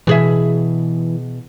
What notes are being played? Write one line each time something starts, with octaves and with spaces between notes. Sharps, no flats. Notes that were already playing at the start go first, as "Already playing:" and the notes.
B2 E3 G#4 E5